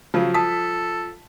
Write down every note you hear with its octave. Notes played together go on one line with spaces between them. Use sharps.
C#3 F3 F#3
A4 A5 D#6 B6